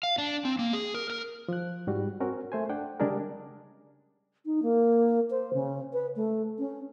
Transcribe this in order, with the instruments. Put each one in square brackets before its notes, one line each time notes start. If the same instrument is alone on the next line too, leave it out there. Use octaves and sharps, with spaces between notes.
[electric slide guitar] F5
D4
C4
A#3
G#4
A#4
A#4
[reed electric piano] F3 F#6
G#2 G3 F#4
C4 C#4 F#4 A#4
A3 C5 G#5
D4 F#5 G5
C#3 G3 G#3 D4 G#4 A#4
[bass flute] D#4
A#3
C5
C#3
B4
A3
C#4